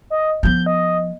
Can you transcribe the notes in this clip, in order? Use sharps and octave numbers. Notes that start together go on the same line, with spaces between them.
D#5
F3 B3 G6
D#5